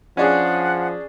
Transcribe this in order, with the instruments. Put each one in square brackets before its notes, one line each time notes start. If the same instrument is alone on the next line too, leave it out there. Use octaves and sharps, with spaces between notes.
[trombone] F3 [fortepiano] C#4 D4 G#4 [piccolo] F#5